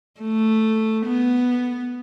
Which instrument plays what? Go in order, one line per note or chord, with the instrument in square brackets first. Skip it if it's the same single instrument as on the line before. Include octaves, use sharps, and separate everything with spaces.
[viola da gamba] A3
B3